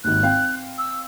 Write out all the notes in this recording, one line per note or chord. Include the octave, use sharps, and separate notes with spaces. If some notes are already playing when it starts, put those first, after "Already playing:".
G#1 D#2 F#6
C4 F5 G5
E6